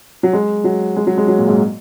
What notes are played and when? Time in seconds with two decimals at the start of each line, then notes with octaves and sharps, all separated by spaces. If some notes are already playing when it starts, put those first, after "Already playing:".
0.23 F#3
0.33 G#3
0.64 F#3
0.96 G#3
1.07 F#3
1.18 G#3
1.28 F#3
1.38 A#2
1.48 G#2